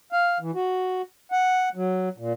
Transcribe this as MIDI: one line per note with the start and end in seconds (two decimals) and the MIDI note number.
0.12 0.38 77
0.40 0.51 52
0.55 1.02 66
1.32 1.69 78
1.75 2.09 54
2.18 2.33 46